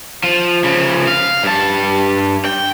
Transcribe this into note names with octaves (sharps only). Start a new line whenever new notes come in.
F3
C#3 F3
F5
G2 A5
G5